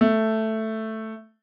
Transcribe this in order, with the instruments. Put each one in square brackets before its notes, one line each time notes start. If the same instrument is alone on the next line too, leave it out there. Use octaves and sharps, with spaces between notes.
[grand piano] A3